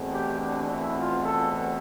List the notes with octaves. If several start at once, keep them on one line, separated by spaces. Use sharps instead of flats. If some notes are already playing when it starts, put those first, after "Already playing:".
Already playing: E2 B2 A3 C4
G4
D4
E4
F4
A4